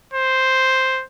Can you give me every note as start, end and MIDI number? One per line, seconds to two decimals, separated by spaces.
0.14 1.04 72